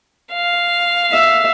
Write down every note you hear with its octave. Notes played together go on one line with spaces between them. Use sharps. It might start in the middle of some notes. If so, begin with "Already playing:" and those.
F5
E5